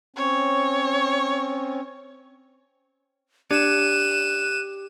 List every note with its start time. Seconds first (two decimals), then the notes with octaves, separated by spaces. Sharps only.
0.16 C4 C#4 C#5
3.51 D4 G4 F#6 D#7 E7